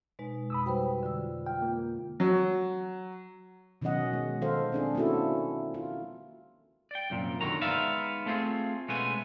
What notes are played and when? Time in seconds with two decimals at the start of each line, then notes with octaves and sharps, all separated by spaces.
0.19 B2 G#3 D#4
0.50 F2 B5 D#6 E6
0.66 G3 F#4 B4 C5 G5
1.03 D3 F4 E6
1.46 F4 G5
1.62 A#3
2.20 F#3
3.82 B2 D#3 F#3 C#4 D#5 F#5
4.13 G#3
4.41 D#3 A4 C5 F5
4.72 C4 D4 G#4
4.95 A#3 C#4 D4 E4 F#4 A4
5.74 F4
6.91 D5 G5
7.10 C2 F#2 A#2
7.41 F#2 B2 D3 D#3 F#3 A#5
7.62 G#3 B3 D#4 D5 E5 F5
8.26 A3 C4 F4 G4 G#4
8.88 B2 G#3 A3 B3 C#4 G#5